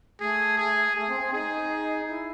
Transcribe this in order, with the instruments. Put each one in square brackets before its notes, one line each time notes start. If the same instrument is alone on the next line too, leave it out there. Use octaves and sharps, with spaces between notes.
[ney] A3 [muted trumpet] G#4
[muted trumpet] G#4
[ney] A3 [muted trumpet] G#4
[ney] C4
C4
[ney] D#4 [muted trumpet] G#4
[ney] E4